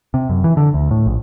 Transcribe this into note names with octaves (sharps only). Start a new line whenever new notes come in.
C3
F#2
E3
D3
D2
A2
A#1